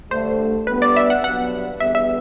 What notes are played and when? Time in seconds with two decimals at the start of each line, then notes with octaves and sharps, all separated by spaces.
0.11 G2 D3 A3 C5
0.67 A2 G3 B3 D4 B4
0.82 D5
0.96 E5
1.10 F#5
1.24 G2 F#3 B3 F#5
1.80 E2 D3 G3 B3 E5
1.95 E5